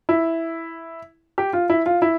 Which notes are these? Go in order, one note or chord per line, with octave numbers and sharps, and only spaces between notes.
E4
G4
F4
E4
F4
E4